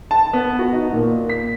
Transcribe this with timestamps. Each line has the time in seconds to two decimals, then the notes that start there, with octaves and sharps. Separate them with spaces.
0.11 A5
0.33 B3
0.59 F#4
0.73 D#4
0.93 A#2
1.30 B6